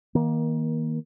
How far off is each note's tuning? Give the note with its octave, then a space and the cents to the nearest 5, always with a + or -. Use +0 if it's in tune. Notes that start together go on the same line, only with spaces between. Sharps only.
D#3 +30 A#3 +20